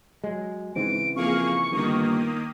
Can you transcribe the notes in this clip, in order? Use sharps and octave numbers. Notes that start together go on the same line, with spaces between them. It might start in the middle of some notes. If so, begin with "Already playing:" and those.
F#3 G#3
G#2 C#3 E3 C4 D7
F2 A#3 G#4 F5 C#6
G1 D#3 A#3 D#6